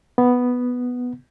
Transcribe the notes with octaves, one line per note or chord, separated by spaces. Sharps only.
B3